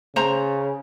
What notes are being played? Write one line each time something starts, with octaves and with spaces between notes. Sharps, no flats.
C#3 C5 A#5